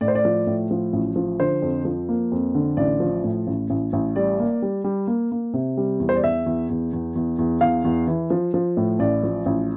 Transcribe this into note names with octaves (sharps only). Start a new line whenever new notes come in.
A2 D5
C5
D5
F3
A2
F3
A1
F3
D3 C5
F2
F3
A#3
F2
D3
A1 D5
F3
A2
A1
A1
A1
G3 D5
A#3
G3
G3
A#3
A#3
C3
G3
E2
C5
D5
E2 E5
E2
E2
E2
E2
E2
E2 F5
E2
E3
F3
F3
A2
A1 D5
F3
A1